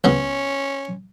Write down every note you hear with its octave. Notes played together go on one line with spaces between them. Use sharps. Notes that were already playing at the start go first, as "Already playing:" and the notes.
C#2 C#3 B3 C#4